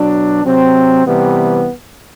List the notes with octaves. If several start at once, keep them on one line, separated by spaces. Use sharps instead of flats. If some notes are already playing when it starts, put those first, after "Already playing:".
Already playing: B2 F#3 D4
C3 F#3 C4
C3 E3 G3 B3